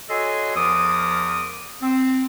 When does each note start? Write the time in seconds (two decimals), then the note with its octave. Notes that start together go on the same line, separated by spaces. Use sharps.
0.10 F#4 A4 C#5 D#5 G#5 C6
0.56 E2 F3 A#4 D6 D#6
1.82 C4